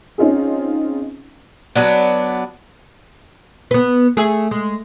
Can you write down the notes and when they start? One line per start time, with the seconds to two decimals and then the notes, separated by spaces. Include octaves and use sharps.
0.18 C4 C#4 D#4 F4 G#4
1.75 F#3 B3 D4
3.71 B3 B4
4.17 A3 G#4
4.51 G#3